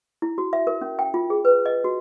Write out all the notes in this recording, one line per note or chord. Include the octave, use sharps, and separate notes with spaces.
E4
F#4
E5
A#4
C#4
G5
F4
G#4
B4
D#5
F#4